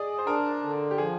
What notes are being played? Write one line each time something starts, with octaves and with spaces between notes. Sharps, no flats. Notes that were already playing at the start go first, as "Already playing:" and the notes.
Already playing: G#4 D5 D#5
C5
D4 A#4
D3
G4
F3 G#4